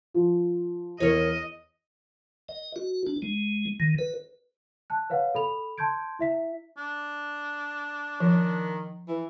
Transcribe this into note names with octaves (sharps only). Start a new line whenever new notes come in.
F3
E2 A#4 C#5 D#5
D#5
F#4
D4
G#3
D#3
B4
A5 F#6
B4 C#5 F5 F#5
A4 B5 F7
A5 C6 G6 G#6 D7
E4 E5 B6
D4
D#3 F3
E3